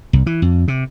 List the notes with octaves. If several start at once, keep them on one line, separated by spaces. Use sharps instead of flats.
C2
E3
F2
C3